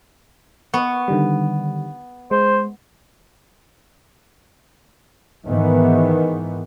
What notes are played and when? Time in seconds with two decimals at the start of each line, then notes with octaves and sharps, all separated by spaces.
0.74 B3 C#6
1.08 D3 D#3 G3
2.31 G#3 C5
5.46 G#2 D#3 E3 B3